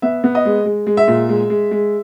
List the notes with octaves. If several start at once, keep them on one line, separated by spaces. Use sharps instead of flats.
B3 E5
B3
D#5
G#3
G#3
G#3
E5
A#2
G#3
G#3
G#3